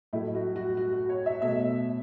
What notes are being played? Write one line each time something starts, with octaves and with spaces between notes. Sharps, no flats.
A2 F#3 A3 E4
F#4
F#4
F#4
F#4
C#5
E5
B2 A3 E5